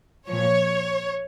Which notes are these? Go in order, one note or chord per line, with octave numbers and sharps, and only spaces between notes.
A#2 F3 C#5